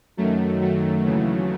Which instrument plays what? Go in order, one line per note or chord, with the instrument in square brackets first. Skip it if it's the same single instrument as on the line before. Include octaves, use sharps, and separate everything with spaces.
[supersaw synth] F#2 D#3 F#3 A3
F#3 A3
D#2 C#3 E3